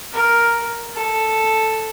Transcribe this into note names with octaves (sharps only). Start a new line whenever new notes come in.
A#4
A4